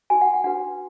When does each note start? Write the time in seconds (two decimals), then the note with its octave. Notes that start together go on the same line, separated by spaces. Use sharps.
0.10 D#4 F#4 B4 G#5
0.21 F#5
0.34 F#5
0.44 D4 F#4 B4 F#5